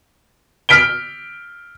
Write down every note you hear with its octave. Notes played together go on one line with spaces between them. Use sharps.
F6 B6 D7 G7